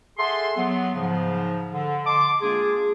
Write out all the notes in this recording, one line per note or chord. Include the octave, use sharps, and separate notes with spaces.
G#4 A4 E5 F#5 C6
F#3 B3
G#2 C#3 F3
D3
D#5 A5 C6 D6
G#3 A#3 D4 F4 G#4